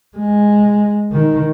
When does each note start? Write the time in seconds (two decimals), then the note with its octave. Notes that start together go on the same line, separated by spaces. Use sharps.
0.17 G#3
1.12 D#3